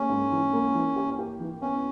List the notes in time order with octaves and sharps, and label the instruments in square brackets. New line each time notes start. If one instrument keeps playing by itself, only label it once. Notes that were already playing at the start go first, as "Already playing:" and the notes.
Already playing: [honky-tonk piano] A#3 G#4 [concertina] C#4
[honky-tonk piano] G#2
E3
A#3
E3
G4
G4
E3
[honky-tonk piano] B3 [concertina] C#4